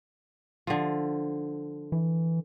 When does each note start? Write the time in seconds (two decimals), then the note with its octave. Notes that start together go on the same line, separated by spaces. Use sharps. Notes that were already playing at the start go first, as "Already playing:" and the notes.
0.67 D3 F3
1.92 E3